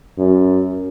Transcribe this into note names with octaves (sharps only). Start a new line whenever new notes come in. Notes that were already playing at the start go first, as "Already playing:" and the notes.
F#2